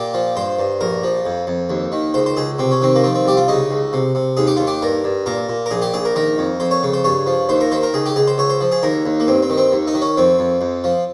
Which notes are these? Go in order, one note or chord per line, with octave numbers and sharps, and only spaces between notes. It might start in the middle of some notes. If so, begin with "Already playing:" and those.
Already playing: A#2 G4
F3
G2 C5
G2
A#1 A#4
F3
F2
F2
D#2
D#3
C#2 C5
C5
C#2 G#4
C3 C4
C#4
D#3 C4
A#3
F3 C4
C4
C2 G4
F4
C#3 D#4
C#2
C3
C3
D#2 G#4
G4
D#2 F4
G4
G2 A#4
G2
A#2 A#4
A#2
A#4
A#1 G#4
G4
A#1 G#4
A#4
D#3 A#4
F2
F2 C5
C#5
C#3
C5
G2 C#5
F3
D#2 C5
A#4
D#3 C5
A#4
C#2 G#4
G4
C#2 G#4
C5
C#2 C#5
C5
F3
G#4
D#2 A#4
D#2
A#3
G2 C4
C4
D#3
C4
D#2
D#4
D#3
C#4
F2 C4
F2
F2
F3